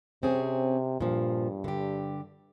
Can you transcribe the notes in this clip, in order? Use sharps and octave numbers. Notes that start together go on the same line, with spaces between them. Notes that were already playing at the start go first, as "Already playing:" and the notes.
C3 C4 C#4 G#4
G2 A#2 F3
D3 G4